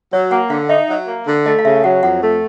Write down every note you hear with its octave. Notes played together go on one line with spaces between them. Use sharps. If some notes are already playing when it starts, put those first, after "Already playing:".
F#3 C#5
A#3 F#5
D3 F5
D#4 E5
F#3
A#3
D3
A3 D#5
F5
C#3 E5
F#3 F#5
F2 F#5
A3